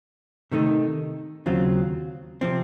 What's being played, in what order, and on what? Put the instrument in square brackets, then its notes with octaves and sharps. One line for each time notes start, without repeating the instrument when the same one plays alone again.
[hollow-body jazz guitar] C3 D#3 A3 D#4
D#2 C#3 F#3 C4 F4
C3 F3 C4